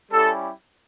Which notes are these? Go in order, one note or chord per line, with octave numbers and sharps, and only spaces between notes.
G3 C#4 E4 G4 A4